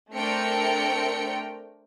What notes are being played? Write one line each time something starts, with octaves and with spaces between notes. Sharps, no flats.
A3 C4 D4 A#4 G5 C#7